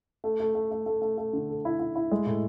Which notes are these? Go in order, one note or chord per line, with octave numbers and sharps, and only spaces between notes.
A3
A3
A3
A3
A3
A3
A3
D3
A4
E4
E4
E4
G#3
A2